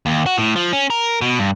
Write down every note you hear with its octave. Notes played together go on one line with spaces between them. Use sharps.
D#2
F#4
A2
F3
C#4
A#4
B2
G2